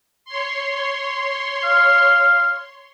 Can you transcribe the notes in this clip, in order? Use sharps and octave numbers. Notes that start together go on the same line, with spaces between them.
C#5 C6
F5